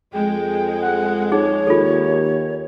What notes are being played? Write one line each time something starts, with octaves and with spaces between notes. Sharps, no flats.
F2 G#3 G5
F#5
D#4 G#4 C#5
D#2 F4 A4